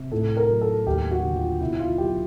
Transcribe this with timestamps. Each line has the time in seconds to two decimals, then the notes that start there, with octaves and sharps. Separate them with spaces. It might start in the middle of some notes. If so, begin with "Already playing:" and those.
Already playing: C3
0.12 A2 A4
0.37 A#4
0.49 F#3
0.61 A4
0.86 D#2 G4
1.11 F#4
1.23 D3
1.36 F4
1.61 B2 E4
1.80 F4
1.98 F#3 G4